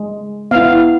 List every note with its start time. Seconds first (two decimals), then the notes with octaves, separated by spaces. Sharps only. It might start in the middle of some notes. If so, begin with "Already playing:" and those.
Already playing: G#3
0.51 B3 E4 F5